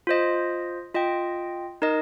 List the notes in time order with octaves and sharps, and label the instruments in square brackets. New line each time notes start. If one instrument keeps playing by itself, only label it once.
[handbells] F4 C5 D#5
F4 D#5 G5
D#4 A#4 D#5